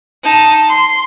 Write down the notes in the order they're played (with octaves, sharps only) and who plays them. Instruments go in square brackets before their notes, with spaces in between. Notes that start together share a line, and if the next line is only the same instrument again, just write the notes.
[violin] D#4 A5
C6